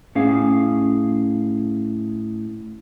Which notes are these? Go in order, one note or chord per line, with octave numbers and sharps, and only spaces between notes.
A2 C#4 G#4 F5